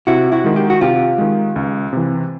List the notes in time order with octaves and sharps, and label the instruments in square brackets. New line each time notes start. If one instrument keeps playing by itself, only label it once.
[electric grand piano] C3 [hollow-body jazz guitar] E4 F#4
[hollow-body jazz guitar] E4 F#4
[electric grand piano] D#3 G#3
[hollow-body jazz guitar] G4
F#4
[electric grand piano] C3 [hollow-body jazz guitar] F4 G4
[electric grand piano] D#3 G#3
C#2
C3 E3